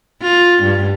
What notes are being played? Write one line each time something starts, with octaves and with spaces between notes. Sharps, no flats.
F4
G2